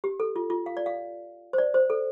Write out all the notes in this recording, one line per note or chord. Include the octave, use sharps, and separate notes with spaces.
G4
A4
F4
F4
F5
D5
F5
C5
D5
C5
A4